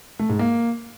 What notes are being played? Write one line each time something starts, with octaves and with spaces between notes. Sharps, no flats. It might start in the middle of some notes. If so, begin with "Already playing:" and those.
A3
G#2
A#3